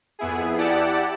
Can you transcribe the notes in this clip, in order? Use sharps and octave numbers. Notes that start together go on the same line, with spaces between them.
F2 B3 E4 G#4
E4 G4 D5 F#5 A5